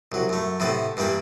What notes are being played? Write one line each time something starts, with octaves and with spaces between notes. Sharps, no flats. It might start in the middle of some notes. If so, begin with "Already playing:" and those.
C2 F#3
F#2 A3
A2 C3 B3 A4
G2 E3 G3 A#3 G4